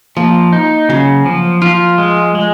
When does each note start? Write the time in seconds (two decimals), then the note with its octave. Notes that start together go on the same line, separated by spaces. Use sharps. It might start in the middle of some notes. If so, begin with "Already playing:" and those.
0.16 F3 A#3
0.53 D#4
0.89 C#3 F#3
1.26 F3
1.62 F3 F4
1.98 G#3
2.35 G#3